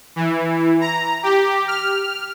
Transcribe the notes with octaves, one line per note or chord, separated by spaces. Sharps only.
E3
A#5
G4
F6